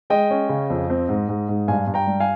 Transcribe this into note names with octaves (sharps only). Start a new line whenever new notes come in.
G#3 D#5 G5
C#4
C#3
F2
C4
G#2
G#2
G#2
G2 F5 G#5
G2
G5 A#5
G3
F5 G#5